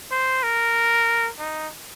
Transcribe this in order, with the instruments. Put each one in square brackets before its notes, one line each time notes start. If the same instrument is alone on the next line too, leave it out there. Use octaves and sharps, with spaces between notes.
[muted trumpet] C5
A#4
D#4